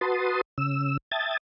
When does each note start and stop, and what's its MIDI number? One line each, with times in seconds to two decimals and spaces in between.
0.01 0.41 66
0.01 0.41 71
0.01 0.41 81
0.01 0.41 84
0.01 0.41 87
0.58 0.97 49
0.58 0.97 88
1.11 1.37 76
1.11 1.37 79
1.11 1.37 81
1.11 1.37 87
1.11 1.37 92
1.11 1.37 93